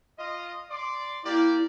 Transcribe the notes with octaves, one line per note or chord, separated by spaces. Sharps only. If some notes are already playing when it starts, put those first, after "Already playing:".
F4 D#5
D5 C6 D6
A#3 E4 G4 D5